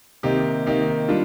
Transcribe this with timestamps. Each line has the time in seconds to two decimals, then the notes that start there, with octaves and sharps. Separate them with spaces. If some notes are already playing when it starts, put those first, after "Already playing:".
0.23 C3 D#3 A#3 D#4 G4
0.66 C3 D#3 A#3 D#4 G4
1.08 G3 D4 F4